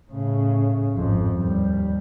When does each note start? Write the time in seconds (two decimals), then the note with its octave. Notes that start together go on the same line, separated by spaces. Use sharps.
0.10 A2 C#3
0.94 G#1 F2
1.38 D#2 G3